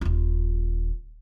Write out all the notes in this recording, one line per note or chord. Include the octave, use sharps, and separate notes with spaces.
D#1 F4